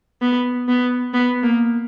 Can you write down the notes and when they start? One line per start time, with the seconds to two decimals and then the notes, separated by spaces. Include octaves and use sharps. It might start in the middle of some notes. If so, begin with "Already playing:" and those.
0.21 B3
0.68 B3
1.14 B3
1.43 A#3